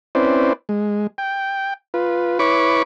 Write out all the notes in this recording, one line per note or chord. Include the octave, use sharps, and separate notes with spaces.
C4 C#4 E4 B4 C5 D5
G#3
G5
F4 B4
E4 B4 C#5 B5 C#6 D6